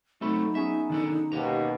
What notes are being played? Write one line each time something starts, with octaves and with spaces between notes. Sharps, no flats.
F#3 A3 C4 D#4 A4 B5
B3 C#4 G#4 E5
D#3 D4 A4
D#2 B2 G4 A#5